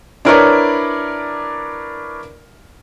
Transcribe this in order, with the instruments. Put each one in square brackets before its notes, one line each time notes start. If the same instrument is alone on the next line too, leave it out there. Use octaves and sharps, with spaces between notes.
[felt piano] D4 E4 A#4 B4 C#5 D5